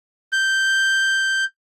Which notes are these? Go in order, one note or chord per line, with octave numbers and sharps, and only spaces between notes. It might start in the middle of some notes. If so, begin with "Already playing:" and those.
G6